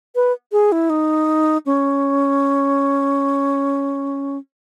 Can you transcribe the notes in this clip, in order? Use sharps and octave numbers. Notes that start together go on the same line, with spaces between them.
B4
G#4
E4
D#4
C#4